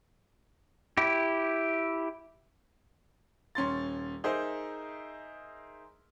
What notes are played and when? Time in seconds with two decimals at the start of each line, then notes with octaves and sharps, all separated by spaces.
0.97 E4 G4
3.55 D#1 C#4 C6 A6
4.24 D#4 G#4 A#4 C5 E5